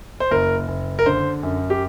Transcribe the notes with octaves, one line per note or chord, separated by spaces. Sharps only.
C5
F#1 A#4
F#1
A#4
D3 C5
F#2
G4